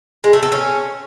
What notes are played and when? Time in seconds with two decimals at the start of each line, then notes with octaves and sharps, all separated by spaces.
0.24 G#3
0.33 A3
0.43 A4
0.52 C#4